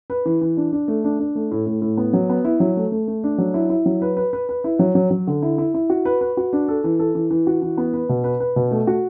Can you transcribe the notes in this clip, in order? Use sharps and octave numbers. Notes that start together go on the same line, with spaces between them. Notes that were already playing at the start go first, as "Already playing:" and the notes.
B4
E3
E3
D4
D4
A3
D4
D4
A3
A2
A2
A2
B3
F#3
B3
E4
F#3
A3
A3
A3
D4
F#3
E4
E4
F#3
B4
B4
B4
B4
E4
F#3
F#3
F#3
D3
E4
E4
E4
F#4
B4
B4
F#4
D4
A4
E3
A4
E3
E3
F#4
E3
B3
B4
B2
B4
B4
B2
A3
F#4